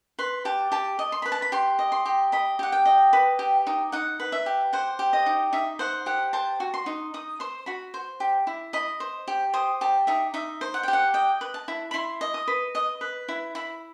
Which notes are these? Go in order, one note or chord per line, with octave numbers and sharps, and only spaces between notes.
B4 C6
G4 A5
G4 A5
D#5
C6
B4 B5
A5
B5
G4 C6
D#5
C6
G4
D#5 B5
G4 F#5
G5
D#5
B4
G4
D#4
D#4 F#5
B4
E5
G4
C5 F#5
G4
D#5
D#4
D#4 E5
C5 F#5
G4 F#5
C5 A5
F#4
C6
D#4
D#4 D#6
C5 C6
F#4 B5
C5
G4
E4
D#5 B5
C5
G4
C5 D#6
G4 A5
D#4 E5
D#4 E5
C5
F#5
G5
G4
F#5
D#5 G5
B4
A5
E4
B5
E4 C6
D#5
D#6
B4
D#5 D#6
B4
E4
E4 B5